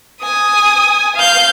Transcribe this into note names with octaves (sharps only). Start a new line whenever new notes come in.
G#5 D#6
F5 G6